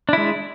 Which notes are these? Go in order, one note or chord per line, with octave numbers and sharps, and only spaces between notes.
G#3 D4 E4